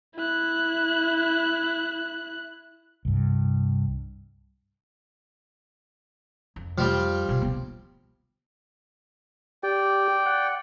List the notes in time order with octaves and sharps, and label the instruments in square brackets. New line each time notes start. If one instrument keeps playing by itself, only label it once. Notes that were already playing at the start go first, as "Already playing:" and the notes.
[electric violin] E4 F#6
[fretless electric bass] C2 G2
[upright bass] F2
[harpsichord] F3 G3
[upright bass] B2 D3
D3 B3
[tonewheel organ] G4 [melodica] D5 G5
[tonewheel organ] F#5